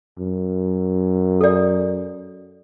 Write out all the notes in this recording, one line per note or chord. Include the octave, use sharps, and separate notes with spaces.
F#2
A4 D5